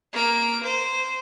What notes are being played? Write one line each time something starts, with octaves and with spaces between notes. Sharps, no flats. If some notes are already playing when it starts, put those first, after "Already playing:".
A#3 D7
C5